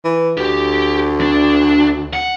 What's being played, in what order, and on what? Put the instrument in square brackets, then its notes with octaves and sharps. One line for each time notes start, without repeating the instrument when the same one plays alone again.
[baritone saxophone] E3
[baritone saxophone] D2 [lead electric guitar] G4
[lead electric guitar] D4
F#5